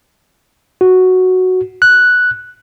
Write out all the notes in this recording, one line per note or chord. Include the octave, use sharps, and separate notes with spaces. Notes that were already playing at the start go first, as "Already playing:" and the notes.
F#4
F#6